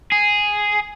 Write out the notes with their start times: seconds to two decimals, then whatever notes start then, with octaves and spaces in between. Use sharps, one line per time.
0.12 G#4